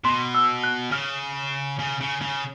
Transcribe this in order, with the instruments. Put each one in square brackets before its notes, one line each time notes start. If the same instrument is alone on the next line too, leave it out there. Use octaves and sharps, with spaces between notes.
[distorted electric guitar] B2 [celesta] C6
[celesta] E6
F#6
[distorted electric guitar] C#3 [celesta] F6
[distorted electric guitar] C#3
C#3
C#3